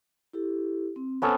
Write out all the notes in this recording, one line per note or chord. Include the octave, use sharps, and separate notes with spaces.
E4 G4 A4
C4
B3 C#4 A4 C5